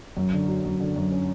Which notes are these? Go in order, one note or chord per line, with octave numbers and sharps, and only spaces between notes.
F#2
D3
F#3
F#2
D3
F#2
C#4